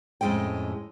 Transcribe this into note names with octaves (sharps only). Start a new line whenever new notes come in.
F2 A2 G#3 C#4 G5